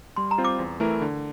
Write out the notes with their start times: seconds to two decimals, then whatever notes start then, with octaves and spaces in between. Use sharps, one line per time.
0.16 G3 C6
0.31 A#5
0.38 C4 F4 C5
0.44 D6
0.59 E2
0.80 E3 A3 E4 A#4
1.01 D3